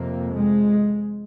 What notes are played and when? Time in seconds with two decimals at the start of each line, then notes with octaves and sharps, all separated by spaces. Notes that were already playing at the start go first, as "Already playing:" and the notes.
Already playing: F2 C3 A#3
0.34 G#3